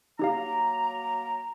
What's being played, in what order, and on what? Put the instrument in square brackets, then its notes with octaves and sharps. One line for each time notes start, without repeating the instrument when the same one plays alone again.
[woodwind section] F#3 A#3 A#5 [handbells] D#4 G4 F5